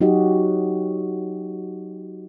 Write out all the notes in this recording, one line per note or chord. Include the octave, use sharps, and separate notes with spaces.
F#3 D#4 F#4 G4 D#5